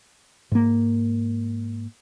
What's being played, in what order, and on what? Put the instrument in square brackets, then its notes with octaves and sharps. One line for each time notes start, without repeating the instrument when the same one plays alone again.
[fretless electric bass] G#2 A#3